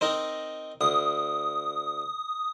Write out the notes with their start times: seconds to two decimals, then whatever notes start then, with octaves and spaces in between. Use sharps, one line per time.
0.01 C4 D#4 A#4
0.81 D2 D#6